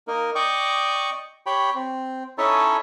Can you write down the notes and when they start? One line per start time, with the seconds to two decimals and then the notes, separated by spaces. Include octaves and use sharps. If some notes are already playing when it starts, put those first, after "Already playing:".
0.08 A#3 D#4 A#4
0.35 D5 D#5 G5 C#6 D6
1.46 G4 C#5 G5 B5
1.75 C4
2.38 C#4 D#4 E4 A4 C#5 A5